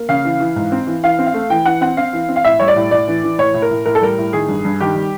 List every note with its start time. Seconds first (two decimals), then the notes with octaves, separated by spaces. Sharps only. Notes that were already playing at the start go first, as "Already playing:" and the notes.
Already playing: A#3
0.09 C#3 F5
0.25 E3
0.40 E3
0.56 G#2
0.72 C4
0.87 E3
1.03 E3 F5
1.19 C4
1.26 F5
1.34 A3
1.50 E3 G5
1.66 E3 F#5
1.81 C4 F#5
1.97 C4 F5
2.13 E3
2.29 C4
2.36 F5
2.44 A2 E5
2.60 G3 C#5
2.68 D5
2.76 A2
2.91 A2 D5
3.08 E3
3.24 E3
3.38 A2 C#5
3.54 A2
3.62 A#4
3.71 A2
3.86 A2 A#4
3.95 A4
4.02 G3 A#4
4.18 A2
4.33 D#3 G#4
4.48 G2
4.65 G2
4.80 D#3 G4
4.96 G3